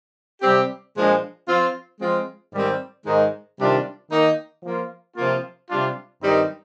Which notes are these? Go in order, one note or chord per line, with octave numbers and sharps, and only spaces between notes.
C3 G3 C4 G4
A#2 F3 G#3 D4
F3 C4 F4
F3 G#3 C4 F4
G#2 D#3 G3 C4
G#2 D#3 G#3 D#4
C3 D#3 G3 D4 F4
D#3 A#3 D#4
F3 A#3 F4
C3 F3 A#3 F4
C3 G3 D4 F4
G2 D#3 G3 C4 D#4